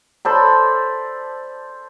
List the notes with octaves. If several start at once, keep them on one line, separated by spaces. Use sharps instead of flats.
A4 C5 D5 B5